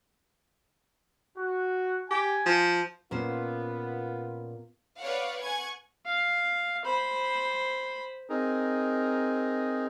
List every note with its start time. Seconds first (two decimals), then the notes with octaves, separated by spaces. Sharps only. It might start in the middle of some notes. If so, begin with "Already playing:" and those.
1.38 F#4
2.11 G4 G#5
2.46 F3
3.11 A#2 B3 C#4 F4 C5
5.00 B4 C#5 D5 F5 F#5
5.42 F#5 G#5 C#6 G#6
6.06 F5
6.85 C5 B5
8.30 C4 D#4 G#4 A#4